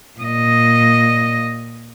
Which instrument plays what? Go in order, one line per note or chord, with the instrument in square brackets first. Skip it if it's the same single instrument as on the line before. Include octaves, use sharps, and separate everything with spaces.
[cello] A#2 D#5